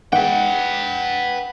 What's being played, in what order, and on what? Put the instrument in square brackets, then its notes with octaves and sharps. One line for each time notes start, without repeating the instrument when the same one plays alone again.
[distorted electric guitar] B4 G5 [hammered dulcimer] F#5